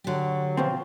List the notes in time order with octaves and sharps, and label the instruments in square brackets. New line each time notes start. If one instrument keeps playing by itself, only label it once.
[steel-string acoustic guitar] D3 G4 [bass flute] F#3
[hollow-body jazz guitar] B2 F3 C4